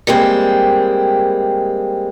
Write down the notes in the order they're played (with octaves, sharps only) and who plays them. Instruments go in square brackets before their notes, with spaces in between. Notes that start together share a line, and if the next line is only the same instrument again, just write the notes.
[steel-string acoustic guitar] G3 G#3 A#3 C4